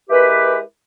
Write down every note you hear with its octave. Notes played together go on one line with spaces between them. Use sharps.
G#3 E4 G4 A#4 B4